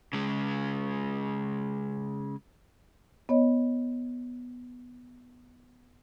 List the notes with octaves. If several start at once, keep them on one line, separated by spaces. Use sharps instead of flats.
C#3 G#3
B3 C#5 D#5